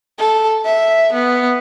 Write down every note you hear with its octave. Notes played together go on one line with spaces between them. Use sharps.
A4
E5
B3